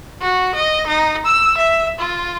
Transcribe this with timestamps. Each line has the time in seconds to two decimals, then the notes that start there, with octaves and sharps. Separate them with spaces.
0.22 F#4
0.55 D#5
0.87 D#4
1.26 E6
1.57 E5
1.99 F4